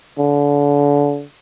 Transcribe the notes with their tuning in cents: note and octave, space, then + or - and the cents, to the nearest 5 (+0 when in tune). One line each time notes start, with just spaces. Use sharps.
D3 -30